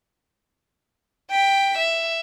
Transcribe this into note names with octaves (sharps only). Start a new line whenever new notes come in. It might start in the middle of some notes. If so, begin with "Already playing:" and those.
G5 B6
E5